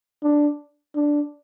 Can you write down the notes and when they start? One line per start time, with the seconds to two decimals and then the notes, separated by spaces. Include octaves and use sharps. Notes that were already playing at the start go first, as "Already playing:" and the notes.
0.23 D4
0.96 D4